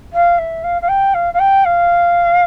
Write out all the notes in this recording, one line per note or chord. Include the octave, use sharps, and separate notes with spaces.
F5
E5
F5
F5
G5
F5
F5
G5
F5